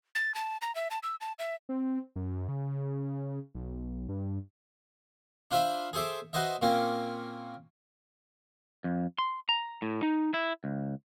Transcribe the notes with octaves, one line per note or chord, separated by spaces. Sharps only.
A6
A5
A#5
E5
A5
E6
A5
E5
C4
F#2
C#3
B1
G2
D4 F4 C5 E5 F5 B5
G#4 A4 C5 E5 D6
F#4 B4 C5 D#5 E5
A#2 A#3 C4 C#4
F2
C6
A#5
A2
D#4
E4
C#2